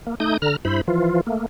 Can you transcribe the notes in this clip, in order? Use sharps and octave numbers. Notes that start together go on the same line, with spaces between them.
A#3
A3 D#4 D#6 G6
D3 A#5 F6
G2 E4 C5 B5
E3 F3 F4
A3 A#3